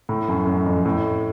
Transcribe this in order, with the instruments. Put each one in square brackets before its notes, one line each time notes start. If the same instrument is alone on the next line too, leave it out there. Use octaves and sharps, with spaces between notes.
[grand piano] A2
F#2
F#2
F2
A2